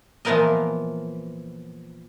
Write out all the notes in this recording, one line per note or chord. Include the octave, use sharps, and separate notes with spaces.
A#2 E3 F3 B3 A#4 D#5